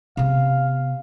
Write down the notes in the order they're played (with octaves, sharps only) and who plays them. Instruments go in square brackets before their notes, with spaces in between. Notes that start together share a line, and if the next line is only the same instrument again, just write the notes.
[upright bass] C3 B3 [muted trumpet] F5